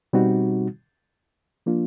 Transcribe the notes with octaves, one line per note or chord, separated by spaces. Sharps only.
B2 G3 C4 D#4 F#4
F3 A#3 D4 F4